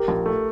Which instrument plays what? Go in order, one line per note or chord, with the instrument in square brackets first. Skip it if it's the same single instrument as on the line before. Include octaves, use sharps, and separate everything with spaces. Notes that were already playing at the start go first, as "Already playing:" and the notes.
Already playing: [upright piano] G4 A#4
[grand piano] A#1
A3